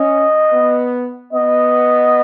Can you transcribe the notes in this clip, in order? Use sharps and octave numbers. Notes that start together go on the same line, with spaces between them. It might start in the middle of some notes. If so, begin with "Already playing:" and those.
Already playing: C#4 D#5
B3
B3 D#5